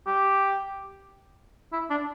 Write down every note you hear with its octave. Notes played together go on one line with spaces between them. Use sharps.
G4
E4
D4